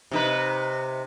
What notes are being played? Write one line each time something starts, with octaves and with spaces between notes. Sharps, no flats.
C3 D#4 B4